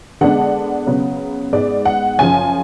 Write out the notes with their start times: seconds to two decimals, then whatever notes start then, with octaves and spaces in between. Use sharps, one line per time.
0.21 D3 G#3 B3 D4 F#5
0.87 C#3 F#3 B3
1.53 G#2 G#3 B3 D5
1.85 F#5
2.18 F#2 C#3 F3 G#5